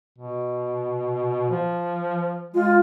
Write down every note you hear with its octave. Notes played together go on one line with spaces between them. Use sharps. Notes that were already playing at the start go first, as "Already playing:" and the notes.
B2
F3
G#3 F4